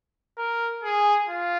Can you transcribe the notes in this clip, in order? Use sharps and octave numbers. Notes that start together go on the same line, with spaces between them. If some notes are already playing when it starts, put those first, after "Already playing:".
A#4
G#4
F4